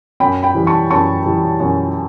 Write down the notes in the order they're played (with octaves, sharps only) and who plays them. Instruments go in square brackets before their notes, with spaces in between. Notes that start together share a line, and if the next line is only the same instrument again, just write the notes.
[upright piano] F#2 [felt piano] G5 B5
[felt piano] G5 B5
[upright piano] E3 G3
[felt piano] A5 C#6
[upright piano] F#2 [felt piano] A5 C#6
[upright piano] E3 G3
F#2